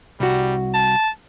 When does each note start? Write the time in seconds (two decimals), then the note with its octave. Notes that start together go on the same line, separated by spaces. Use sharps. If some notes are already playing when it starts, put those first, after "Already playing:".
0.20 C2 G3 F#4
0.74 A5